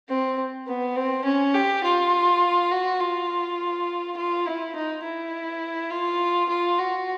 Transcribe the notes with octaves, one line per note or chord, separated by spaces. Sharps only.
C4
B3
C4
C#4
G4
F4
F#4
F4
F4
E4
D#4
E4
F4
F4
F#4